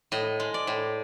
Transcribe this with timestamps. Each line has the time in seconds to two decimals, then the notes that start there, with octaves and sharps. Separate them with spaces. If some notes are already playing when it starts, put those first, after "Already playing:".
0.12 A2 D#5
0.40 G#3
0.54 D5
0.67 A2